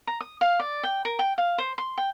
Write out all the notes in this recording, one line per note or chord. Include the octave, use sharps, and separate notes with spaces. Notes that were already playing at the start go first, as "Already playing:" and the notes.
A#5
D#6
F5
D5
G5
A#4
G5
F5
C5
C6
G5